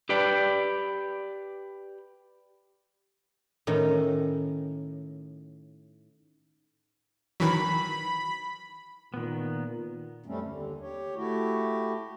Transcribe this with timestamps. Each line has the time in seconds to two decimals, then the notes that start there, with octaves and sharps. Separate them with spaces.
0.09 G4 B4 D5 G5
3.67 A2 D#3 C#4
7.40 D#3 E3 F#3 B5
9.14 A#2 D#3 B3
10.26 F#2 G3 A3 C4 C#4
10.41 D#2 D3
10.81 G4 C#5
11.15 A3 E4 F#4 G4